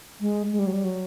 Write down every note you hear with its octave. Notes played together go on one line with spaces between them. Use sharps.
G#3
G#3
G3
F#3
G3
F#3